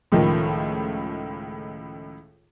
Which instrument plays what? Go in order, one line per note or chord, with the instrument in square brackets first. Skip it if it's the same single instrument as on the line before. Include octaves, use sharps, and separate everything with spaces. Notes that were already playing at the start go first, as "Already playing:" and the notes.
[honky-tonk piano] C#2 A2 D#3 F3